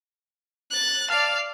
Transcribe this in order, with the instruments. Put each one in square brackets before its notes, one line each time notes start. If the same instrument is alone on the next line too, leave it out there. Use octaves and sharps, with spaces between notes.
[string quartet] F#6 A6
[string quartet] D5 F5 [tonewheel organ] A5 F6